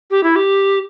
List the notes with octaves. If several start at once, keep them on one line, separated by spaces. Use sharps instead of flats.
G4
E4
G4